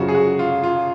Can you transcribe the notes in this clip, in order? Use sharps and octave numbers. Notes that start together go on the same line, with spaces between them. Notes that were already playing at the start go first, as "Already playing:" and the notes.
Already playing: F#2 C#3 F3 F#4
G#4
F#4
F4
F4